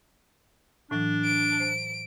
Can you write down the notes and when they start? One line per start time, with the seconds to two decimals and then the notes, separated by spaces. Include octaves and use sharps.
0.91 A2 E3 F#3 D4
1.25 D7
1.60 C5